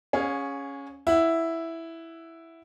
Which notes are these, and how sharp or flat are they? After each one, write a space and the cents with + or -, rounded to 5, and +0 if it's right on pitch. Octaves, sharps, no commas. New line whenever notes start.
C#4 +0 G#4 -20 F5 +35
E4 +0 F#5 +0